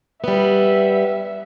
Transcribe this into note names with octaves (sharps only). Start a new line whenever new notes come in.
G3 B3 E5